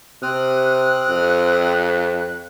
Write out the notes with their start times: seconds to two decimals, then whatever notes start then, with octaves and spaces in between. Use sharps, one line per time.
0.23 C3 C4 D#6 F6 F#6
1.09 F2